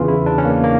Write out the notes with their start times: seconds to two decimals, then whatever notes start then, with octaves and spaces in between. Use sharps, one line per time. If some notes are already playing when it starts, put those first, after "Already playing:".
Already playing: E2 C#3 E3 F4
0.08 E4
0.26 D4
0.38 C#4
0.45 A#3
0.64 A#3